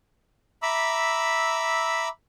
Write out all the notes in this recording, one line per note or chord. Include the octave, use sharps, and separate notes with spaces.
E5 A#5 B5 D6 E6